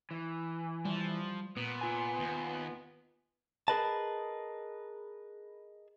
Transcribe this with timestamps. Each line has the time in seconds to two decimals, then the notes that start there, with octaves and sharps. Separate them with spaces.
0.11 E3
0.85 F3 G3
1.57 A#2 B3
1.81 F4 G#5
2.19 D#2
3.68 G#4 A#4 B4 D#5 A5